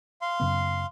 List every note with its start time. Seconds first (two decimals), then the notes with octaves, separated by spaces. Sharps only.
0.21 F5 C6
0.40 F#2 C#3 B3